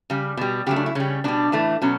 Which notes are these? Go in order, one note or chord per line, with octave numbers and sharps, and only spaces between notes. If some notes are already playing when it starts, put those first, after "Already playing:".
C#3 G3
B2 G3
C#3 F#3 A3 G4
D4
E4
C#3 G3 C#4
B2 G3 D4
A2 E3 A3
B2 F#3 C#4